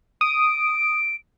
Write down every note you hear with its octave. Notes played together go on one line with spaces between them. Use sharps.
D#6 D7